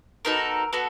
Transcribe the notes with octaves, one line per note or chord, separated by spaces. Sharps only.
B3 D#4 F#4 A4 A#4
B3 F#4 A4